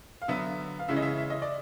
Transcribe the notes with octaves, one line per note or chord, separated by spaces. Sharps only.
F5
D3 F#3 B3 E5
F5
C#3 E3 G#3 C#4 E5
D#5
E5
E5
D#5
D5